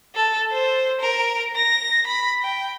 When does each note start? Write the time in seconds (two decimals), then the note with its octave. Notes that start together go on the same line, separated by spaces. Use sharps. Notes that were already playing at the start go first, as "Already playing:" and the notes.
0.15 A4
0.52 C5
1.01 A#4
1.56 A#6
2.07 B5
2.43 G5